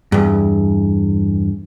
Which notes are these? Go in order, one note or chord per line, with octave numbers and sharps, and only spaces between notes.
E2 G2